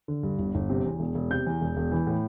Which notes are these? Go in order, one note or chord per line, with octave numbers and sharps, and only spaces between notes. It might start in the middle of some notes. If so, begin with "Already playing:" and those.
D3
G2
G1
G1
C3
E2
E1
E1
C3 G6
E2
E1
E1
E3
A2